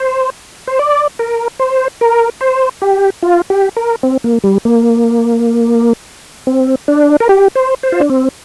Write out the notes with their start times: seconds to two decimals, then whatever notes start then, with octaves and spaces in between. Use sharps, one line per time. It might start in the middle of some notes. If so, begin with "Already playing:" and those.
Already playing: C5
0.67 C5
0.79 D5
1.19 A#4
1.59 C5
2.01 A#4
2.41 C5
2.82 G4
3.23 F4
3.50 G4
3.77 A#4
4.03 C4
4.24 A#3
4.44 G3
4.65 A#3
6.47 C4
6.88 D4
7.20 A#4
7.29 G4
7.55 C5
7.83 C5
7.92 F4
8.00 D4
8.10 C4